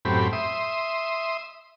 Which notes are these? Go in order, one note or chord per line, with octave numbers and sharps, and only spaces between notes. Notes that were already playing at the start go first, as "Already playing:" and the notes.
F#2 A2 C4 G4 B5
E5 C6 D#6